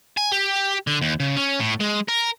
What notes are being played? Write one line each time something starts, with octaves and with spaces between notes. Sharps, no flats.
G#5
G4
D3
D#2
C#3
C#4
A2
G#3
A#4